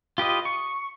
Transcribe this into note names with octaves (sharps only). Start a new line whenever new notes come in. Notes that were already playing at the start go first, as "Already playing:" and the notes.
F4 G4 B4 D#5
C#6